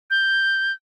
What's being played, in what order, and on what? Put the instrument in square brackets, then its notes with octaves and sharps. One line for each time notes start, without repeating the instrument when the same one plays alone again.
[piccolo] G6